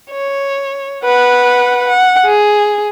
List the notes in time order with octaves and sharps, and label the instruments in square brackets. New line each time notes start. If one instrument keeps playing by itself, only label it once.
[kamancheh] C#5
B4 F#5
F#5
G#4